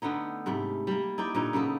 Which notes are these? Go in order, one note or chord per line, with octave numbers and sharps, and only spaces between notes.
D3 A3 B3 D#4
G#2 C3 G3 A3
G3 A#3
D#4 E4 D5 G5
A#2 D3 D#4
C#3 A#3 B3 A4